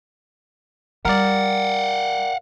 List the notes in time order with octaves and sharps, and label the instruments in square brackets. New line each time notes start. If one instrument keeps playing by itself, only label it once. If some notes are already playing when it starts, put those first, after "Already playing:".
[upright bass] G3 [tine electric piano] A#4 D5 [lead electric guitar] F5 F#5